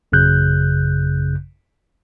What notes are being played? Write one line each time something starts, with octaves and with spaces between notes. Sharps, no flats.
A1 F#2 C#3 F#6 G6